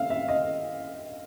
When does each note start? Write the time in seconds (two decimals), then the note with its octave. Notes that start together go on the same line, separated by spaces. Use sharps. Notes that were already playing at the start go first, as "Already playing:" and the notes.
Already playing: E5 F5
0.10 E5
0.28 D#5